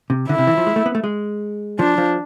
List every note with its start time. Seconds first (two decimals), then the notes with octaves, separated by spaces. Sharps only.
0.10 C3
0.29 D3 E4
0.38 C3
0.47 E3
0.57 F3
0.66 G#3
0.76 A3
0.86 B3
0.95 A3
1.04 G#3
1.79 F3 D4
1.98 F3